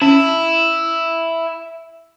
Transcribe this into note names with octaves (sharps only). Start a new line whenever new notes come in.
C#4 E4